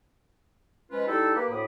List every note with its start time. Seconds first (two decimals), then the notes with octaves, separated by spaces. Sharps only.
0.92 F3 G#3 C#4 F4 B4
1.07 G3 D#4 E4 A4
1.35 A#3 G4 B4
1.50 D2 A2 B5 D6 D#6